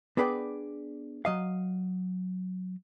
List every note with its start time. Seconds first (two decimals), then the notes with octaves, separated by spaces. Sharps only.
0.17 B3 D4 G#4 B4 D5 G5
1.25 F#3 D#5 F5